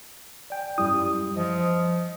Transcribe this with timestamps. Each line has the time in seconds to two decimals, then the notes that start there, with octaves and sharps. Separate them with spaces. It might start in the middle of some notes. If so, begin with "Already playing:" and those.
0.50 D5 G5 G#5
0.78 F#2 G3 E4 D#6
1.37 F3 D#5